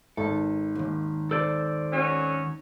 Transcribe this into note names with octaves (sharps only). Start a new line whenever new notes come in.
G#1 A4
D#2 G#2
A4 C5 D5
F#3 C#4